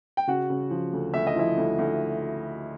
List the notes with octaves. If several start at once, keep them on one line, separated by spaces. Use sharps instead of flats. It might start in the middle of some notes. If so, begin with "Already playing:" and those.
G5
C#3 F#4 F#5
C#3
F3
D2
D2 E5
D#5
F3 E4 E5
D2
D2